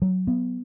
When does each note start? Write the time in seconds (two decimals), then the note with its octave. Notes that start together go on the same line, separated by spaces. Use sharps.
0.02 F#3
0.27 B3